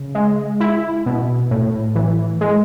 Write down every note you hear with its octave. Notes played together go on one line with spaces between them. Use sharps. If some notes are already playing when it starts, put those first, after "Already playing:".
Already playing: C#3
G#3
E4
B2
A2
E3
G#3